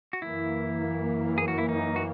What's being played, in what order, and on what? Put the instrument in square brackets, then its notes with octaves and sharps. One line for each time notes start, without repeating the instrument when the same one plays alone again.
[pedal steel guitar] F#4
[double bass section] F#2 E3 A#3 [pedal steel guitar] E4
[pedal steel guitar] G#4
F#4
E4
D#4
F#4